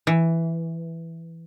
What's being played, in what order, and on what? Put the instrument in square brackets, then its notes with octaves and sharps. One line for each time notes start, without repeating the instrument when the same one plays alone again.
[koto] E3